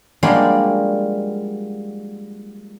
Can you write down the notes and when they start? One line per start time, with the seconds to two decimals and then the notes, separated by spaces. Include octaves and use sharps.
0.23 F3 G3 G#3 A#3 D4 F#4